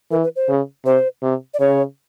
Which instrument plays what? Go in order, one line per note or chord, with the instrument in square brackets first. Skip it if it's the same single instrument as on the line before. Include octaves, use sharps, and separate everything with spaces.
[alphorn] E3 [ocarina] A#4
[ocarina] B4
C5
[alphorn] C#3
[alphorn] C3 [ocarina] C5
[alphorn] C3
[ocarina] D5
[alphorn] C#3 [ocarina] C#5